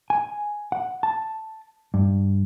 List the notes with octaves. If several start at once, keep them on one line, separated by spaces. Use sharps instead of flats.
G#5
F#5
A5
G2